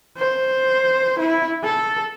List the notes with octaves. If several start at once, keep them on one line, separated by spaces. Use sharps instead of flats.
C5
E4
A4